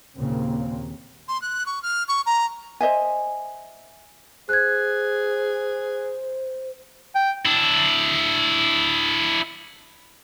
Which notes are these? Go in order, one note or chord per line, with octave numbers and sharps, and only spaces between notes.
D#2 A#2 C#3 A#3 C4
C6
F#6
C#6
F6
C#6
A#5
C5 D#5 E5 G#5
G#4 C5 F#6 G#6
G5
D4 E4